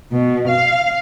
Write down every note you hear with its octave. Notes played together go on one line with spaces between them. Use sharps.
B2
F5